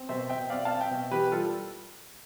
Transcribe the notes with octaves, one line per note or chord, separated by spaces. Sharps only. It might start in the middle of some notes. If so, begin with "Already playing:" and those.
Already playing: C4
B2 C5 E5
B2 E5 G5
C4 D5 F5
F5 A5
C4
E5 G5
B2
E3 G4 B4
G3 F4 A4